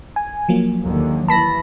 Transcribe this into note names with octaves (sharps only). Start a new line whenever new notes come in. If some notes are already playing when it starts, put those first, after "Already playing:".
G#5
F3 F#3 A#3
D#2 D3
E3 A5 B5 A#6